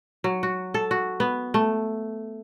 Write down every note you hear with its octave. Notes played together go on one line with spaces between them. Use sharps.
F#3
F#4
A4
F#4
B3
A3